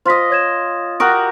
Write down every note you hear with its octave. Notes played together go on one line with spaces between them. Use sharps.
F4 C5 D#5 C6 B6
C#5 G#6 E7
F#4 G4 A#4 D#6 D7